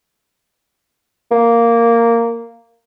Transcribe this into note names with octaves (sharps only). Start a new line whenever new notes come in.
A#3